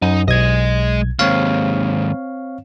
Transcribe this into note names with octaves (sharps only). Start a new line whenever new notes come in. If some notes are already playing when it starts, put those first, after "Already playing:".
F#2 D#4
B1 G#3 D#5 G#6
D#2 G#2 C4 C#5 F5